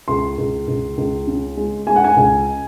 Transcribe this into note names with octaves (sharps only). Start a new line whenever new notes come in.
C#2 C6
C#2
C#2
C#2
C#3
G#3
G#3 G#5
F#5
G#5
C#2